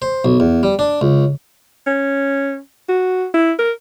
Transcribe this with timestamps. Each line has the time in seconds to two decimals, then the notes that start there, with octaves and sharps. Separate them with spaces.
0.02 C5
0.25 B1
0.40 E2
0.63 G3
0.79 D4
1.01 C#2
1.87 C#4
2.89 F#4
3.34 E4
3.59 A#4